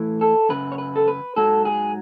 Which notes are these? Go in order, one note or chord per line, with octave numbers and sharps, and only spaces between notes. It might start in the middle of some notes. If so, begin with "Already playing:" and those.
Already playing: A2 E3
A4
F#2 C#3 B4
C#5
B4
A4
B4
G#2 F#3 A4
G#4